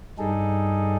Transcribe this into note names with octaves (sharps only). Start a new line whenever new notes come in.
G2 G3 D#4 G#4 A4